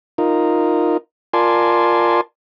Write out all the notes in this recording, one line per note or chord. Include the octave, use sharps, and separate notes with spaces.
D#4 F4 A#4
F4 A#4 D5 G#5 A5 C6